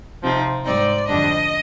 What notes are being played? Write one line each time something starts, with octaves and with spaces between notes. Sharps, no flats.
C3 F3 C4 D#4
G#2 G3 C4 D#4 D5
F2 D3 G3 D4 D#5